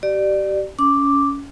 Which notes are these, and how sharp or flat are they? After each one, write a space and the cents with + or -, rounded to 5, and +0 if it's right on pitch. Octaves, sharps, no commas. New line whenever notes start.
G4 -30 D5 +20
C#4 +20 D6 +0